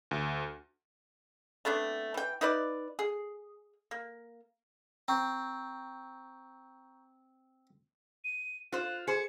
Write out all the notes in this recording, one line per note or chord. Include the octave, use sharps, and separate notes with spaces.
D2
A3 B3 C4 D4
E3 G5
D#4 E4 B4 D5
G#4
A#3
C4 A#5 C#6 G6
D#7
F4 C5 F#6
G#4 C5 C#7